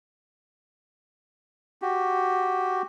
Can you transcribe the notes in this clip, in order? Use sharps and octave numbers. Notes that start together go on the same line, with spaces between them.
F#4 G4